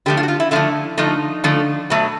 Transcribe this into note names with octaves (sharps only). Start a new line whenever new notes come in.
D3 F3 A3 G4
F4
F#4
F4
E4
D3 F3 A3 E4
D3 F3 A3 D#4
D3 F3 A3
B2 F#3 A3